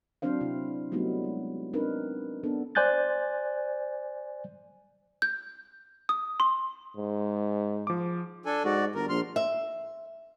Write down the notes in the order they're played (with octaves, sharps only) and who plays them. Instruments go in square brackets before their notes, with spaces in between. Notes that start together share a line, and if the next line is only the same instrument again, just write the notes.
[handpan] F#3 C4 D4 C5 F5
C3 E4
F#3 G3 A3 B3 D#4 E4
G#3
C4 D4 D#4 A#4 B4
B3 D4 A4
[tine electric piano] C5 D5 G#5 F#6 G6 A6
[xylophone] G6
D#6
C6
[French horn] G#2
[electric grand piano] F3 D6
[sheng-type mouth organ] D4 A4 G#5
[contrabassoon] G#2 [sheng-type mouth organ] F#4 D5
[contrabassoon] G1 [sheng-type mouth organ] A#4
[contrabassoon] A#1 [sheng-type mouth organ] C6 F6
[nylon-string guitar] E5